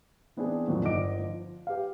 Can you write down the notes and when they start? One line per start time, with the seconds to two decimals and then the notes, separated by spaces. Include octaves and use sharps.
0.37 E3 B3 C4 D4 G#4
0.68 F2 A#2 D3 D#3 F3 F#3
0.84 G1 D5 D#5 D6 D7
1.19 F3
1.67 G4 B4 F5